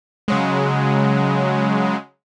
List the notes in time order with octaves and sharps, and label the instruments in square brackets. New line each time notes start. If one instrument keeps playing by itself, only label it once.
[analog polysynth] C#3 F#3 G#3